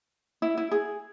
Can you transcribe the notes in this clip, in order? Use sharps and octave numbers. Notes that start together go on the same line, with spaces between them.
E4
E4
G#4